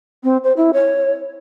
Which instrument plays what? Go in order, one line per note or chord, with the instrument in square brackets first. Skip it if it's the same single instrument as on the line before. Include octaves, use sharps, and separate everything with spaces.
[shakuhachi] C4
C5
E4
C#5